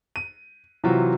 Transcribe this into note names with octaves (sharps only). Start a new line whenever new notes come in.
D#7
C3 E3 F#3 F4 F#4